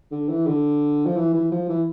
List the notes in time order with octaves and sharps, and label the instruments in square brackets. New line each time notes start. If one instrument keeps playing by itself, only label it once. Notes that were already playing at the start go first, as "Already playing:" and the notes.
[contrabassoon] D3
E3
D3
F3
E3
E3
F3
E3